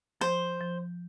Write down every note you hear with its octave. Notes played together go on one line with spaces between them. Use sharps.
F3 C5
F3